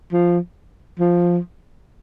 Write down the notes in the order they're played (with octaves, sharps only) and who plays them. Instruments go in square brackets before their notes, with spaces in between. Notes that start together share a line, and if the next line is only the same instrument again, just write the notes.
[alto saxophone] F3
F3